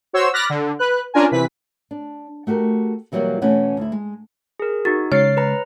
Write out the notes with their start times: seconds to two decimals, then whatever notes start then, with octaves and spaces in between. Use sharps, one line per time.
0.13 F#4 C5 C#5 C6 E6
0.34 B5 D6 F6 F#6 A6 A#6
0.50 D3
0.79 B4 F#6
1.14 C#4 D4 F4 A#4 G#5
1.31 C3 E3 B4 B6
1.91 D4
2.47 A3 F#4 G4 A#4
3.12 B2 E3 F#3 G3 A#3 B3
3.41 B2 E3 A3 C#4 F#5 G#5
3.77 D2 E4
3.92 G#3
4.60 G#4 A#4
4.85 D#4 F#4 A6
5.12 C#3 G#3 C#5 F6 A6 C7
5.37 B4 A#5